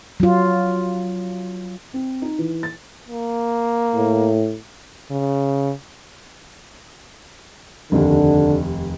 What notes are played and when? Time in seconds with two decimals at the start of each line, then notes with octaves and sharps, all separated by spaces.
0.20 F#3 F4
1.94 C4
2.22 D#4
2.39 E3
2.63 A6
3.09 A#3
3.94 A2
5.11 C#3
7.92 F1 D#2 D3